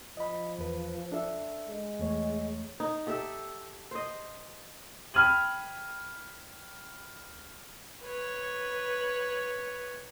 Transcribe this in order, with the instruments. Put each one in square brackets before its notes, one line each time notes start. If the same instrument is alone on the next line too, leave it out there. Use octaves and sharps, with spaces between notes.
[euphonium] F3 [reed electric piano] D#5 B5
[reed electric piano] E2 B4
D4 A4 E5
[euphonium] G#3
[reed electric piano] E2 A3 C#5
[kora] D#4
G4 A4 E5
C5 D#5
[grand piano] G5 B5 F6 G#6 D#7 F#7
[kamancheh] B4 C#5